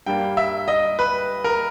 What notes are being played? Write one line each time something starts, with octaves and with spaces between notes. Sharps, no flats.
G2 G3 A#3 G5
E5
D#5
B4
A#4